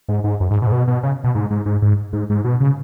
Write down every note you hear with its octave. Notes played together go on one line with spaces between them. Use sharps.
G#2
G#2
F#2
G#2
B2
G#2
B2
B2
C#3
B2
G#2
G#2
G#2
G#2
G#2
G#2
B2
C#3